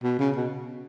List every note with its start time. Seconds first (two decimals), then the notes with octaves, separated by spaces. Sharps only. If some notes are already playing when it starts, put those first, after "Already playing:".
0.03 B2
0.19 C#3
0.36 B2